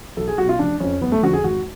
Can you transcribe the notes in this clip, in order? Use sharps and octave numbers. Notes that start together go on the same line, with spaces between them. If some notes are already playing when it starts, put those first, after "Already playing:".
B1 A4
G#4
B2 F#3 F#4
F4
F1 D4
F2 F3 C#4
F#1 B3
A3
F2 D3 F3 F#4
G#4
G#1 F#4